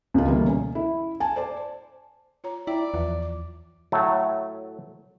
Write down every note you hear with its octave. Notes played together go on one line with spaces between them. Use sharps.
C#2 F4
B2 D3 E3 G3 A3 A#3
C#4
E4
G#5 A5
C5 D5 A5
F4 C#5 A#5
E4 D5 G5 A#5
E2 F3 F4 E5
D6
A2 F#3 A3